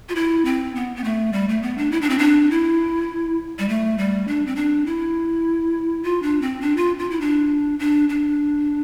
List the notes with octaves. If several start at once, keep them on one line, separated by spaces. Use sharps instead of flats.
F4
E4
C4
B3
B3
A3
G3
A3
B3
D4
E4
D4
C4
D4
E4
G3
A3
G3
D4
C4
D4
E4
F4
D4
C4
D4
F4
F4
E4
D4
D4
D4